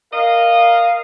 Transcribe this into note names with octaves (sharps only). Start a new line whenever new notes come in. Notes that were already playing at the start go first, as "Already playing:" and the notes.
A#4 D#5 F5